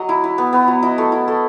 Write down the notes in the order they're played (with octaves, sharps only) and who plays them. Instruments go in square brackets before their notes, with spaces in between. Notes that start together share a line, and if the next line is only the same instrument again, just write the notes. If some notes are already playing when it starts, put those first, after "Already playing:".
Already playing: [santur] F#3 D#5
E4
E4
B3
B3
F#3
E4 D#5
A3
E4
A3